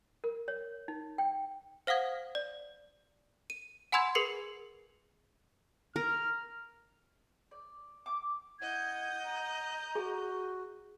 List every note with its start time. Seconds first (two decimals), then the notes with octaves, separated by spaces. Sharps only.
0.24 A#4
0.48 C#5
0.88 D#4
1.18 G5
1.87 C5 F5 F#5 D#6 G#6
2.35 D5
3.50 D#7
3.92 F#5 G#5 B5 C6 E6 G#6
4.15 G#4 A#4 B4 C7 C#7
5.96 A#4 F6
7.51 D5
8.06 D6
8.61 E4 D#5 F#5 G6 G#6
9.24 A#5
9.95 F#4 G#4